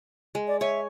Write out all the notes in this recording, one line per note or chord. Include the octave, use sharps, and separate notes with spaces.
G#3
D5
C#5 E5 G#5